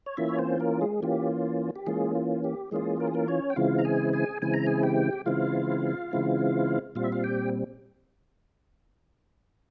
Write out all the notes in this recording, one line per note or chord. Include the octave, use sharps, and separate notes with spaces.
C#5
E3 A#3 C#4 E4 F4 E5
C#5
C4 C5
A#3 A#4
G#3 G#4
E3 A#3 C#4 F4 G4
G4
E3 G#3 A#3 C#4 F4 G#4
F4
G4
E3 G#3 A#3 C#4 F4 G#4
A#4
G#4
A#3 A#4
C#4 C#5
G5
C#3 E3 G#3 C4 E4 F4 F5
A#5
G#4 G#5
G#4 G#5
C#3 E3 G#3 C4 E4 G#5
A#5
G#4 G#5
G4 G5
C#3 E3 G#3 C4 E4 F4 F5
C#3 E3 G#3 C4 E4
A#2 G3 C4 F4 F5
E5
F4 F5
G4 G5